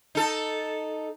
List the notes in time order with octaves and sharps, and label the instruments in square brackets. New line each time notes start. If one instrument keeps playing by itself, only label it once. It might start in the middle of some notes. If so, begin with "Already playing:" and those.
[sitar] D#4 A4